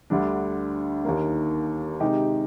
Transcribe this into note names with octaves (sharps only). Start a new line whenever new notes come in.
D2 D3 G3 D4
D#2 D#3 A#3
C3 D#3 G#3 D#4 G4